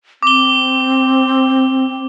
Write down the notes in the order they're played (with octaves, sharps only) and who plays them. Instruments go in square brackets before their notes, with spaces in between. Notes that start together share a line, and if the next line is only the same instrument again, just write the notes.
[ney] C4 [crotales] D6 G7